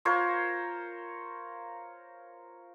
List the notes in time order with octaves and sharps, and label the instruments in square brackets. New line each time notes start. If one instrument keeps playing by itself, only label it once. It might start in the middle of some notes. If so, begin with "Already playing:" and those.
[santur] F4 A#4 C5 C#5